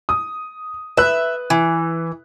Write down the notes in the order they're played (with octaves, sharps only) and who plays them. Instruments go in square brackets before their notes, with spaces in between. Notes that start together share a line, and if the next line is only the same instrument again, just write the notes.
[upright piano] D#6
[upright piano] B4 F#6 [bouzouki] E5
[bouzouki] E3